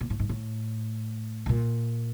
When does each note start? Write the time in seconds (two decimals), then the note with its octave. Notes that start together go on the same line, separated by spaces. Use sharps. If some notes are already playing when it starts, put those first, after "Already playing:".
0.01 A#2
0.10 A2
0.20 G#2
0.29 A2
1.46 A2
1.49 A#2